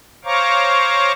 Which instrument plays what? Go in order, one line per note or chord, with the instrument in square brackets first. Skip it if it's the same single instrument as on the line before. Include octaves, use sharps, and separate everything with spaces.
[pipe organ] C5 C#5 F5 A#5 C#6 D6